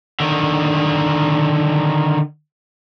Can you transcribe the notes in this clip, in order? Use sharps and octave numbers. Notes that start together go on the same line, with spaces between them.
D3 D#3